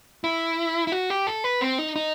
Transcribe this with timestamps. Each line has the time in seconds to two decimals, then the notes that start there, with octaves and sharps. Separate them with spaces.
0.24 E4
0.87 E4
0.92 F#4
1.10 G4
1.27 A4
1.44 B4
1.61 C4
1.78 D#4
1.96 D#4